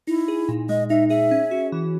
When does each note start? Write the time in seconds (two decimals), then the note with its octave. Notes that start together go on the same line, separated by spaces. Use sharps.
0.07 D#4 E4
0.28 G#4
0.49 A#2
0.69 G#3 D#5
0.90 D#4 E5
1.10 G#4 E5
1.31 C#4
1.51 F#4
1.72 E3